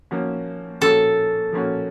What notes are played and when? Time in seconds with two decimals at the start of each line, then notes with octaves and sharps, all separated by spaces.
0.11 F3 A#3 C#4 F#4
0.81 F3 A#3 C#4 F#4 A4
1.52 F3 A#3 C#4 F#4